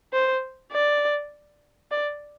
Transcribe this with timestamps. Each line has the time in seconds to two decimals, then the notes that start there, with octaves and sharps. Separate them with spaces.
0.13 C5
0.73 D5
1.91 D5